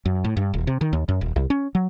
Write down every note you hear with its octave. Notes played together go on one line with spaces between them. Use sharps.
F#2
A2
G2
D#1
C3
D#3
D#2
F#2
D#1
C2
C#4
F#3